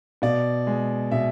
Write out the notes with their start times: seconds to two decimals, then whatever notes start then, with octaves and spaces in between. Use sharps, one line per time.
0.22 B2 D5
0.67 G#3
1.11 B2 E5